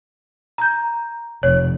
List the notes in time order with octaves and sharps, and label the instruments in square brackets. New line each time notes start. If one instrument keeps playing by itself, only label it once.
[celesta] A#5 G6
[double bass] F1 [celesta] C#5